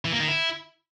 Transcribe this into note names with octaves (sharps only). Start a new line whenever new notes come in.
E3
A#3
D#3
E4